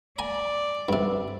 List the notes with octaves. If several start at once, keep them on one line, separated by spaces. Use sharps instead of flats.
D5 G#5 A#5
G2 C3